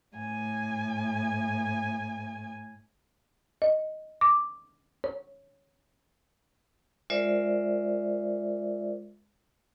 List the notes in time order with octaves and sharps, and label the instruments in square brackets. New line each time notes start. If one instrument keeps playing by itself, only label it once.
[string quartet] A2 G#5
[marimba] D#5
D6
C#5
[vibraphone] G#3 F4 A#4 C5 D5 E5